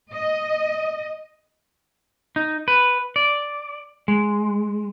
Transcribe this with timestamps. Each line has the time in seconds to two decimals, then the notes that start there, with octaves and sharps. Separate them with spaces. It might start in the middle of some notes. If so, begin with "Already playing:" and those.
0.12 D#5
2.36 D#4
2.68 B4
3.16 D5
4.08 G#3